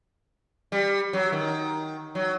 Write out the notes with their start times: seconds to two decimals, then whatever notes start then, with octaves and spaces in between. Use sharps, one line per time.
0.72 G3
1.13 F#3
1.32 D#3
2.15 F#3